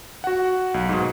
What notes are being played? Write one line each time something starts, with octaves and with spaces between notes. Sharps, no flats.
F#4 F#5
B1
G#2 B2